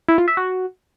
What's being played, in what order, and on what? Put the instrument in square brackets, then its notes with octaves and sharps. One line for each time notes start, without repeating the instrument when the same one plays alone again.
[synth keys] E4
F4
E5
F#4